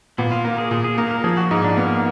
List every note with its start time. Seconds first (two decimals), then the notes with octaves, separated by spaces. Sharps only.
0.18 A#2 B3
0.32 F4
0.44 A#3 A#4
0.58 G#4
0.71 A#2 G#4
0.84 G#4
0.98 A#3 A#4
1.11 A#4
1.24 F3 G#4
1.37 F#4
1.51 G#2 D#4
1.64 D4
1.77 A#3 B3